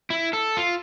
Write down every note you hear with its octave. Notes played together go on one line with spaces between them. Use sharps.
E4
A4
F4